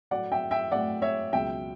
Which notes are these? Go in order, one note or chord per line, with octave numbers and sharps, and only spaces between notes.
A2 F#3 A3 D5 F#5
E5 G5
E5 G5
A2 F#3 A3 D5 F#5
C#5 E5
C#2 B2 F#3 E5 G5